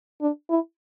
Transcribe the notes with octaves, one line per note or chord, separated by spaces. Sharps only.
D4
E4